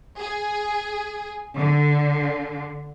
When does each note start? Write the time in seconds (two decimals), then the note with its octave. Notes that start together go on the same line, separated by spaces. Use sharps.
0.20 G#4
1.56 D3